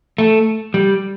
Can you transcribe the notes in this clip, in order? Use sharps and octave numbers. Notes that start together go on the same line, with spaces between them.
A3
G3